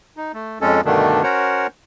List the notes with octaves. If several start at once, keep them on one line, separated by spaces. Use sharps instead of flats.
D#4
A3
F2 G#3 C#4 A4
G2 B2 D3 D#3 A3 D4
C#4 F#4 A#4 C5 C#5 F#5